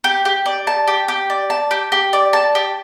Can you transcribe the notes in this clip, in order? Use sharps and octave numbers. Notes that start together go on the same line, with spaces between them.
G4
G4
D5
A5
G4
G4
D5
A5
G4
G4
D5
A5
G4